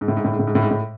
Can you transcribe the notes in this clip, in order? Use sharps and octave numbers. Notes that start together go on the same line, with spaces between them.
G#2
A2
G#2
A2
G#2
A2
G#2
A2
G#2
A2